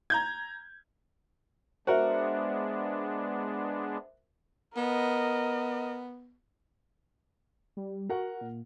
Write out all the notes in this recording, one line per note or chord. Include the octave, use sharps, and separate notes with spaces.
A#5 G6 G#6
G#3 B3 D4 F#4 A#4 C5 E5
B3 A#4 D#5
G3
F#4 A#4 F#5
A#2